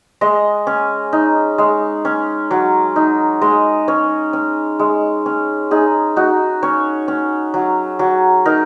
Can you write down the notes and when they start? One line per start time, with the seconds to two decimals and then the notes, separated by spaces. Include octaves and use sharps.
0.21 G#3 D#5
0.67 C#4
1.13 D#4
1.58 G#3
2.05 C#4
2.51 F#3
2.96 D#4
3.41 G#3 D#5
3.88 C#4 C#5
4.33 C#4
4.79 G#3
5.26 C#4
5.71 D#4 G#4
6.16 D#4 F#4
6.63 C#4 C#5
7.08 C#4
7.54 F#3
7.99 F#3
8.45 D#4 A#4